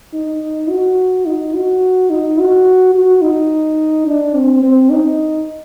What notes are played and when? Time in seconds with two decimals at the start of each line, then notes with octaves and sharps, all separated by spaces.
0.14 D#4
0.70 F#4
1.26 D#4
1.54 F#4
2.10 D#4
2.39 F#4
2.94 F#4
3.22 D#4
4.07 D4
4.35 C4
4.63 C4
4.90 D#4